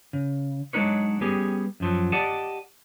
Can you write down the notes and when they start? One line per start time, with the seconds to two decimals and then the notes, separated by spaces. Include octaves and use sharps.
0.13 C#3
0.73 F#3 G#3 D4 D#4 B4 C#5
1.21 G3 B3 C#4 G4 G#4
1.80 F#2 F3 F#3
2.12 G4 D5 D#5 F#5 A5